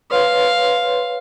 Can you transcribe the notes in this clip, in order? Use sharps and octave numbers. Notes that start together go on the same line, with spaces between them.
B4 C#5 F5 C6